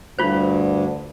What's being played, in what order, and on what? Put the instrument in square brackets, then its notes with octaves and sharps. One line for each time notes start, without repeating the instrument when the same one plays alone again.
[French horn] D2 [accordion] G2 [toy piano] E4 F4 C5